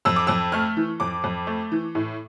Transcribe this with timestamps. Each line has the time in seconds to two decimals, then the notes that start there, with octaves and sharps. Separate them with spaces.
0.05 F2 E6
0.16 D6
0.27 F2 E6
0.52 A3 F6
0.77 E3
1.00 F2 D6
1.24 F2
1.47 A3
1.72 E3
1.95 A2